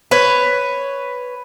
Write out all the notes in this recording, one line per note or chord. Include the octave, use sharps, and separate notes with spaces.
B4 C#5